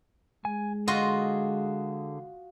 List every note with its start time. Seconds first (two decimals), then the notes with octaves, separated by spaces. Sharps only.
0.45 G#3 G#5
0.88 D3 F4 F#4 G#4 D#5 C6